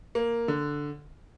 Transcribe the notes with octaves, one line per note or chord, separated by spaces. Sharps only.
A#3
D3